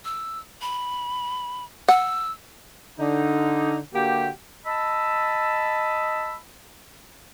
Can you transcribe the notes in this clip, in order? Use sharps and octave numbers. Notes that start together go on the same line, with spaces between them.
E6
B5
F#5 E6
D3 D#4
D3 A#3 F#4 G4
D#5 A5 B5 E6